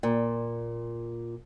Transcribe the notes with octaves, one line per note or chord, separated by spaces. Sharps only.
A#2